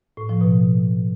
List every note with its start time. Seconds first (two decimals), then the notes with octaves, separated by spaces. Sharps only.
0.17 A2
0.29 F3
0.41 B2